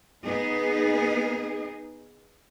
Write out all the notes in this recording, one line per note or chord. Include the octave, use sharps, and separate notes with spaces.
B3 D#4 G#4